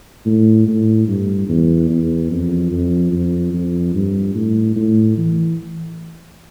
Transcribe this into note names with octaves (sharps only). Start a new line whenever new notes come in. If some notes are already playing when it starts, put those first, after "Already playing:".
A2
A2
G2
E2
E2
F2
F2
F2
F2
G2
A2
A2
E3